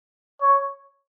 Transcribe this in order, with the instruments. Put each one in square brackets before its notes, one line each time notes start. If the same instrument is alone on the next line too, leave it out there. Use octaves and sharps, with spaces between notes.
[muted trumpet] C#5